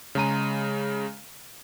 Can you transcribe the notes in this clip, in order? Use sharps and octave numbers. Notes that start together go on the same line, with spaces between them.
C#3 G#3 A#5 D#7